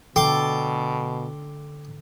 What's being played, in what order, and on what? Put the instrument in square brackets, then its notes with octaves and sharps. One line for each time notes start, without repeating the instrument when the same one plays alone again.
[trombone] B2 [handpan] D3 A4 [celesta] G5 [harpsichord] C6 D6